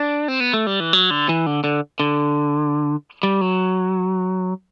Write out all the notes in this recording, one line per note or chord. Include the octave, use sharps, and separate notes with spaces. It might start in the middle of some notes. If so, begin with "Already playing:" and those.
Already playing: D4
C4
B3
A3
G3
E3
F#3
D3
E3
D3
D3
D3
G3
F#3